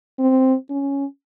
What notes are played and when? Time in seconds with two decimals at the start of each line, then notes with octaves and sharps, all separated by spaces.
0.19 C4
0.70 C#4